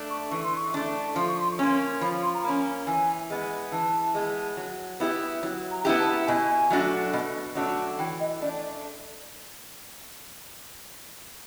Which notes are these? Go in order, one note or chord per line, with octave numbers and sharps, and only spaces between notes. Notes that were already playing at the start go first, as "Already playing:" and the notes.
Already playing: A3 D4
C#6
E3 C#6
C6
C#6
A3 D4
F3 C6
C#6
C6
C#6
A#3 C#4 C6
F3 B5
C6
A#5
A#3 C#4 B5
E3 G#5
G#3 B3
E3 A5
G#3 B3
F#3
B3 E4 G4
F#3
A#5
B3 E4 G4
A5
B2 G#5
F#3 A3 D4 F#4
B2
F#3 A3 D4 F#4
E3 G5
D#5
A3 D4 D5